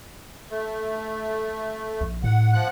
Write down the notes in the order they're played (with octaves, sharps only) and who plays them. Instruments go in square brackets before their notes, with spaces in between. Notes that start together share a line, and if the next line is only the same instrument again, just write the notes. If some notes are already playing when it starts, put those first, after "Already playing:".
[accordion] A3
[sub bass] A#1
[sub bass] A2 [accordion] F#5
[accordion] F3 F#5 F#6